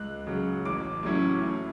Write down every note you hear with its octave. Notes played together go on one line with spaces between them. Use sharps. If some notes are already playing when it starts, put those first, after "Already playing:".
Already playing: C#2 F#6
C#3 F#3
A1 D6
A2 F#3 C#4 E4
A2